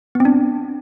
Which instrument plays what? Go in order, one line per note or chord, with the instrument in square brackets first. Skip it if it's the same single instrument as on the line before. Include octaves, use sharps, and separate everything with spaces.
[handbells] B3
C4
D4